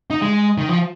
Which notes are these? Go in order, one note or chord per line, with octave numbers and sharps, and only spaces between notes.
D#4
G#3
D#3
F3